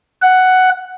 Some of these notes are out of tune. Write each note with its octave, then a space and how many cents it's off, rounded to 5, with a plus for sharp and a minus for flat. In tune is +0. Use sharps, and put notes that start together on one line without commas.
F#5 +5